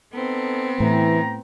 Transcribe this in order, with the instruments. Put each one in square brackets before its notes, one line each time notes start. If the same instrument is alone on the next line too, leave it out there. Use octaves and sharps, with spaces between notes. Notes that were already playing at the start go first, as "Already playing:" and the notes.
[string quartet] B3 C4 [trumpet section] D#4 A4
[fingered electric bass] A2 [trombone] E3 [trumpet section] G5 A#5